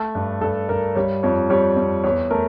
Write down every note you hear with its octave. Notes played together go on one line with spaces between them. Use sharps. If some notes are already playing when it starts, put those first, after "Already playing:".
Already playing: A3
G2
G2 A4
G2 A#4
G3 C#5
F2 C#5
G3 C#5
F2
E2 C#5
A3 A#4